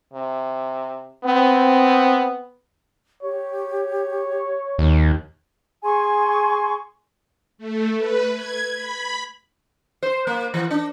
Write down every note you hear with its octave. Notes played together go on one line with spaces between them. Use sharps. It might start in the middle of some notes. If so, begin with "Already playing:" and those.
C3
B3 C4
G4 C#5
D#2
G#4 G#5 C6 C#6
A3
B4
G#6
B5
C5
A#3
E3
D4